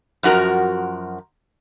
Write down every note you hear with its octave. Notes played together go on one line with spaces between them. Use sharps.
F#2 F3 F#4 A#4 A#5